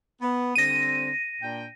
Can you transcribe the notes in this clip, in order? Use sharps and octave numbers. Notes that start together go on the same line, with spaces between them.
B3
D3 G3 C4 A#6 D#7
A#2 D4 G5